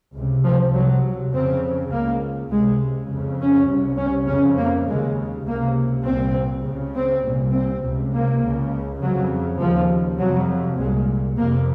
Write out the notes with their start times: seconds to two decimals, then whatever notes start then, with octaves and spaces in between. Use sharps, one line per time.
0.16 C#2 C3
0.44 F3
0.74 C2 C3 F#3
1.33 F2 C#3 C4
1.92 C#2 C#3 A#3
2.52 C#2 C3 G#3
3.11 F2 C#3
3.41 C#4
3.69 C2 C3
3.99 C#4
4.28 F2 C#3 C#4
4.59 A#3
4.88 D#2 C#3 G#3
5.47 C#2 C3 A#3
6.06 C2 A#2 C4
6.65 C#2 C#3
6.95 C4
7.24 C2 A#2
7.53 C4
7.83 C#2 C3
8.13 A#3
8.42 C#2 C#3
9.01 F2 C#3 F#3
9.60 D#2 C#3 F3
10.20 F2 C3 F#3
10.79 C2 A#2 G#3
11.37 F2 C3 A#3